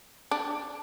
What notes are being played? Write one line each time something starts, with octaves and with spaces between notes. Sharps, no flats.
D4